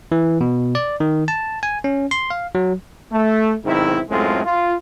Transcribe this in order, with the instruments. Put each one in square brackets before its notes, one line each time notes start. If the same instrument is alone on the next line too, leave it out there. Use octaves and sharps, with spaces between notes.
[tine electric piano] E3
B2
D5
D#3
A5
G#5
C#4
C6
F5
F#3
[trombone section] A3
B1 G#2 D#3 C4 E4
F#2 A2 G#3 A3 C4 F4
F4